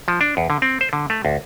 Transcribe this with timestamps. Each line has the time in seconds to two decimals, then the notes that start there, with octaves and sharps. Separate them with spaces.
0.08 F3
0.21 D4
0.37 E2
0.50 D3
0.62 C4
0.81 C5
0.93 D3
1.10 A3
1.25 D2